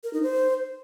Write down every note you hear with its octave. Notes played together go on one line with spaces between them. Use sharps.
A#4
D#4
C5